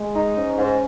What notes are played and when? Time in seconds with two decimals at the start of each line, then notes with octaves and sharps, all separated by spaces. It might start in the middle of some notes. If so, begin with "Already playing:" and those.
Already playing: G#3
0.15 D#4
0.36 G#2 C#4
0.58 G#2